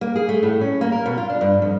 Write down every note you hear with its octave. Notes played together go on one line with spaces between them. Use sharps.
A#3
G#4
A3
A2
C#4
A#3
A#4
B2
F4
D4
G2
F2